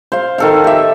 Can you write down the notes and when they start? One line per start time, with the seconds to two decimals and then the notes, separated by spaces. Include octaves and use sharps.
0.12 C5 F5
0.38 D#3 A4 F5
0.64 G4 E5